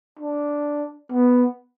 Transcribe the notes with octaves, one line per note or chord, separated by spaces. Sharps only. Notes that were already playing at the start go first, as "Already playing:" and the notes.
D4
B3